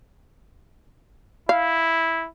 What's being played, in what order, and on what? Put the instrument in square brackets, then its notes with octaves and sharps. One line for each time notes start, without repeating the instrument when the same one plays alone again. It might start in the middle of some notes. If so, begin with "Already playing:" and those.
[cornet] E4 [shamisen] F5